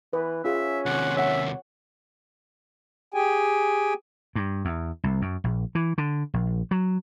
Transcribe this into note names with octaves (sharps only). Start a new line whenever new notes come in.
E3 B4
C#4 F4 G#4 E5
D#2 C3 F#5
C#5 E5 F#5
G4 G#4 G5 G#5
G2
E2
C2
F#2
A#1
E3
D3
A#1
F#3